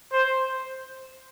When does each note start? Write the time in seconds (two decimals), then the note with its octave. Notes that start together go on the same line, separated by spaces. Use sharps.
0.13 C5